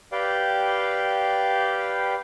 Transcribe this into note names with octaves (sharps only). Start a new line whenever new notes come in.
G4 B4 D5 F5 G5